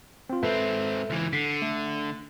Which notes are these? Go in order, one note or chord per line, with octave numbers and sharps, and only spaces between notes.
C4 F4
G#2 C4 A4 B4 E5
C#2 E3
D3 B6 C7
A3